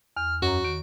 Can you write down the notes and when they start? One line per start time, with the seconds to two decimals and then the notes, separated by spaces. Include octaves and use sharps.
0.16 E2 F6
0.42 F#2 F#4 C#5 A#5
0.64 D#3 D7